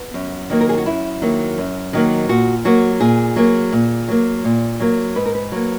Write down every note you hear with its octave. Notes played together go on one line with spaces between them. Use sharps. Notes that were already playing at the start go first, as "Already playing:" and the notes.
Already playing: B3
F#2
D#3 F#3 A#3
A#4
G#4
F#4
F#2 E4
D#3 F#3 A#3
F#2
D#3 F#3 A#3
A#2 F#4
F#3 A#3 F#4
A#2 G#4
F#3 A#3
A#2
F#3 A#3
A#2
F#3 A#3
G#2 B4
A#4
B4
F#3 A#3